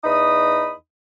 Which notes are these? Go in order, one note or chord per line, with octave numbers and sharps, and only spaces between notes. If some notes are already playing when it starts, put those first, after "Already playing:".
E2 D#4 B5 D#6